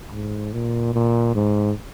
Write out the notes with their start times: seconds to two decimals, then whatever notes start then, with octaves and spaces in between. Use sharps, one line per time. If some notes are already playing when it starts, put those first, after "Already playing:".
0.11 G#2
0.53 A#2
0.94 A#2
1.35 G#2